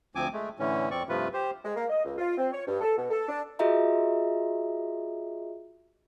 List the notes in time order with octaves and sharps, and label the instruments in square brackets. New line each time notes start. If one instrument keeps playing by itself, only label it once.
[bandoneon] D2 F3 C4 G#5 D6
G#3 A3
A2 D3 E3 C#4
F2 C4 D5 C#6
G2 C3 F3 A3 F4 B4
G4 C5
[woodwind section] G#3
A#3
D#5
C#2
F4
C4
C#5
G2
A4
B2
A4
D4
[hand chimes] F4 F#4 G#4 D#5 E5 A#5